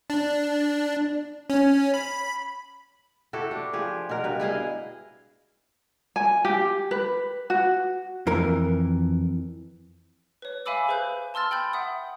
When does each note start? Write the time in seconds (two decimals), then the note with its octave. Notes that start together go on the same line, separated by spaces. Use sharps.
0.10 D4
1.50 C#4
1.94 B5
3.33 E4 F#4 G4 A4
3.51 D4
3.73 F3 G4 G#4
4.09 B2 A#4
4.24 G2 B4
4.40 E4 G#4 D#5 F5
6.16 G#5
6.45 G4
6.91 B4
7.50 F#4
8.27 F2 E3 A#4
10.42 B4 C#5
10.66 E5 F5 G#5 B5 D6 E6
10.88 G#4 B4 C5 F#6 G6
11.34 A5 C6 E6 F6 A6
11.51 G5 B5 G6
11.73 E5 F#5 D#6